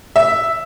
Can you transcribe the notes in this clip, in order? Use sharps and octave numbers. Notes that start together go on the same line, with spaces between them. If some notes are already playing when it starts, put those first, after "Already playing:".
E5